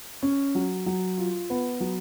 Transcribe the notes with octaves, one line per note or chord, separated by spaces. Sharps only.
C#4
F#3
F#3
F4
B3
F#3